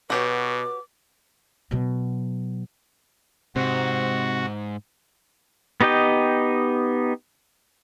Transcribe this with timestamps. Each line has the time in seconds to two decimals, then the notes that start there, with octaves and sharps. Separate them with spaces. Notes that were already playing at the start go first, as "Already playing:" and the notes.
0.10 B2 F#4 G4 B4 C#5 D6
1.71 B2 F#3
3.56 G#2 C3 C4 F#4
5.81 B3 D#4 G4 D#5 G5